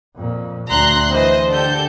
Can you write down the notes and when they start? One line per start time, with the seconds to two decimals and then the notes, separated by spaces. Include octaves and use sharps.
0.16 F2 A#2
0.68 D2 A#5 C6 F#6
1.11 E3 C5 D#5
1.52 D3 G4 A4 G6